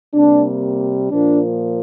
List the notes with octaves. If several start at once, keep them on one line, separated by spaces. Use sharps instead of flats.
C3 G3 A#3 D4
A#2 F3 A#3 D4